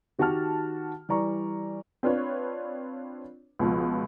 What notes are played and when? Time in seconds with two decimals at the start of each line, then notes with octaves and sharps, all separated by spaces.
0.19 D#3 F#4 G4 F#5 A5 F6
1.09 E3 G3 D5 A#5 C#6
2.03 C4 D4 F4 B4 C#5
3.59 C#2 B2 F3